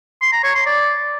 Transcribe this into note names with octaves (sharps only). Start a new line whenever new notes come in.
C6
A#5
C#5
C6
D5